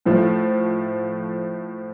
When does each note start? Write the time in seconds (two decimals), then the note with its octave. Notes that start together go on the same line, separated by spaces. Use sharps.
0.06 A2 F3 A3 F4